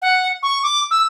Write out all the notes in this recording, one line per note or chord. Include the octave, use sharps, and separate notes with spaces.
F#5
C#6
D6
E6